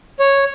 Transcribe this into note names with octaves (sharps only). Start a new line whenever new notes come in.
C#5